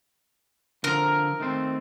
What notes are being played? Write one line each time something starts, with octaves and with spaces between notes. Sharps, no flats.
D3 F3 A#4
D#3 A3 C4